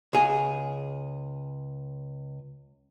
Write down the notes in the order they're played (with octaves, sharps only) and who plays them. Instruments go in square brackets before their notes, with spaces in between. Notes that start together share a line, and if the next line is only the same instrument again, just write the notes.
[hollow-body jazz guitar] C#2 G#4